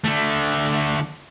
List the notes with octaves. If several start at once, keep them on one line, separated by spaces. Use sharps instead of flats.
D3 A3